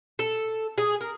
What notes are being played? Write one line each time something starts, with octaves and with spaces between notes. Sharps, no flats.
A4
G#4
A#4